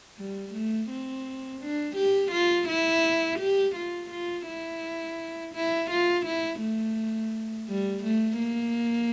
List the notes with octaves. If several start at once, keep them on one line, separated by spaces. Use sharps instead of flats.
G3
A3
C4
D4
G4
F4
E4
G4
F4
F4
E4
E4
F4
E4
A3
G3
A3
A#3